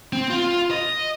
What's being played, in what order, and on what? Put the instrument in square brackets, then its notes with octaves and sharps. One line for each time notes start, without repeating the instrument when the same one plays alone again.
[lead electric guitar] C4
F4
D#5